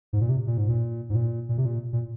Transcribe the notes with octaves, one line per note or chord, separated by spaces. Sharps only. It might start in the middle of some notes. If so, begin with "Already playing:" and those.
G#2
A#2
C3
A#2
G#2
A#2
G#2
A#2
A#2
C3
A#2
A#2